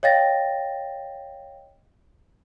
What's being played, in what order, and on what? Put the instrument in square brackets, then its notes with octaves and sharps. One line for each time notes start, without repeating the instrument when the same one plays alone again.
[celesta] C#5 D#5 F5 G5 A6 A#6